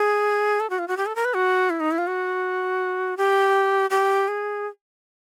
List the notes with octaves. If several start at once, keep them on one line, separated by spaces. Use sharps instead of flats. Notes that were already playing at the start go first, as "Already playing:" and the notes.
Already playing: G#4
A4
F#4
F4
F#4
G4
A4
A#4
B4
F#4
E4
D#4
E4
F4
F#4
G4
G4
G#4